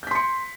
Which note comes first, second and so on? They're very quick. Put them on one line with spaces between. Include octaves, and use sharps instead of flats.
G6 B6 C6 C#7